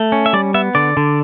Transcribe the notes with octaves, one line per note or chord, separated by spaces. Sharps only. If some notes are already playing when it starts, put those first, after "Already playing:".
Already playing: A3
C#4
E5
G3 D5
B3 E5
D3 D5
D3